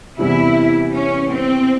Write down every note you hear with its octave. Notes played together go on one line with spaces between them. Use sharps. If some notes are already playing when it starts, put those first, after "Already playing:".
E2 C3 E3 G3 E4
C#4
C4